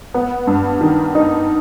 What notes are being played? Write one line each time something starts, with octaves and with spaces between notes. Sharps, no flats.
B3
G2
D#3
D#4